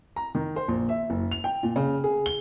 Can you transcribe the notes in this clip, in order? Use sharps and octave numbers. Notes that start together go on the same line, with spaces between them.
A#5
D#3
C5
A#1
E5
F#1
F7
G5
A#2
C#3
G#4
G7